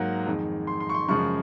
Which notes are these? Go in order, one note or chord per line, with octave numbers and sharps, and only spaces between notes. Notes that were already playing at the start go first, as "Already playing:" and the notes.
Already playing: G#2 F#3 A#3 F#5
F2 D#3 G#3
C6
C6
C#6
C6
F#2 C#3 F3 G#3 C#6